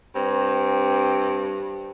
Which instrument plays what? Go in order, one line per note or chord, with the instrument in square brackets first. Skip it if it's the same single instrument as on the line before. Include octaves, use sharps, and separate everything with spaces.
[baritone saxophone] G2 [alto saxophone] C4